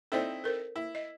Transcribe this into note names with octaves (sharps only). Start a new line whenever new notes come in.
C4 D#4 E4 A4 C5 D5
A4 A#4 C5
E4
D#5